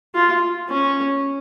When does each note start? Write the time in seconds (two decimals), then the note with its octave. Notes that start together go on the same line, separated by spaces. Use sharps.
0.15 F4
0.70 C#4